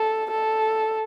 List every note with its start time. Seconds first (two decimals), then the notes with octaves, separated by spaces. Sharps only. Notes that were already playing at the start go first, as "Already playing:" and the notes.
Already playing: A4
0.31 A4